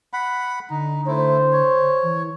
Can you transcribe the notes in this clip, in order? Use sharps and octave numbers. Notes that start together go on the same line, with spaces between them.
F#5 B5
D3 D#4
A3 E4 C5
C#5
E3